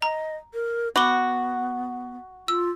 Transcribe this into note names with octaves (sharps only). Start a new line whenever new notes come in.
D#5 A#5
A#4
B3 F#4 B5 D6 G7
F4 E6